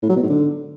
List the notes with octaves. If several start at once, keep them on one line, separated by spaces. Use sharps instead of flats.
A2
F#3
B2
G#2
D3